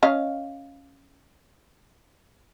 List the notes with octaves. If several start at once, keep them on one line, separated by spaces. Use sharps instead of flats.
C#4 D#5 F5